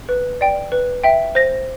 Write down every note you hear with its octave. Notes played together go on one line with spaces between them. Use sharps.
B4
D5 G5
B4
E5 G5
C5 A#6